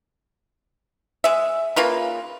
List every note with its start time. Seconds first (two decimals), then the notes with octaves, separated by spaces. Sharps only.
1.24 G#3 E5
1.76 C#3 A#3 F4 B4